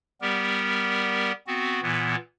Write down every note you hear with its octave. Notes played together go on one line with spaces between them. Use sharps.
G3 B3 G4 A#4
B3 C4 F#4
A#2 E3 B3